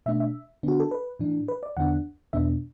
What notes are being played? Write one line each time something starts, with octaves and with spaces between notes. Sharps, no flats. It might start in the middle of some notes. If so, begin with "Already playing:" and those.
B2 A3 D4 E5
E5
D3 B3 D4 F#4
A4
B4
A2 E3 D4
B4
D5
E2 D3 B3 D4 F#5
E2 B2 B3 D4 E5